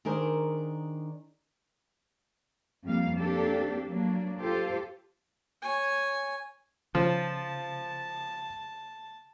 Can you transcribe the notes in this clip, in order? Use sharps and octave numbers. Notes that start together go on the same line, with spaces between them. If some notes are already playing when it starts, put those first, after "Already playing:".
D#3 D4 G#4 A#4 C5
F2 G3 A#3 F5
A#3 C4 D4 G4 A4
F#3 A#3 D4
F4 G4 A4 C5
C#5 G#5
C#3 F3 A5